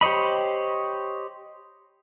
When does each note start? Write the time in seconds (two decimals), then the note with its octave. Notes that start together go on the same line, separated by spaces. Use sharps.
0.01 G4 C5 C#5 D#5 B5